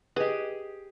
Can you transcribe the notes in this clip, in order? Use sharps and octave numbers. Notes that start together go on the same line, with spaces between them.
G4 G#4 B4 D#5